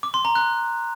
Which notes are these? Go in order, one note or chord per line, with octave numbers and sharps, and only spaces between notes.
D6
C6
A#5
F#6